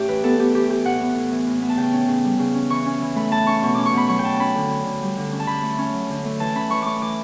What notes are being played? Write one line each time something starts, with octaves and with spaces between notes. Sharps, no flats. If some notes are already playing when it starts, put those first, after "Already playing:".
Already playing: A2 A3 C#4 G4
E3 B4
B3 A4
B3 G4
E3 G4
E3 G4
A2 F#5
B3
A2
E3
A2
B3
A5
C#3 G5
C#4
C#3
G3
C#3
C#4
E3 C#6
C#4
E3
A3 B5
E3 A5
C#4 C#6
B2 C#6
C#4 D6
C#6
B2 B5
F#3 C#6
G5
B2 A5
C#4 B5
D3
C#4
D3
G3
D3
C#4
A5
D3 B5
A3
C#4
F#3
D3
A3
E3 A5
C#4 B5
E3 C#6
A3 C#6 D6
E3 D6